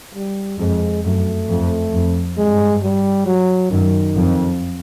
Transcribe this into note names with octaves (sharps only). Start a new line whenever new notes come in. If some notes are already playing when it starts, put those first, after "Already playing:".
G3
F2 G#3
F#2 A3
F2
F2
G2 G#3
G3
F#3
F#2 D#3
F2